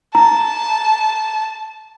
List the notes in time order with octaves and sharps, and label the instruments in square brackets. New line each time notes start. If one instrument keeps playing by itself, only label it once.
[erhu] A5 [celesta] A#5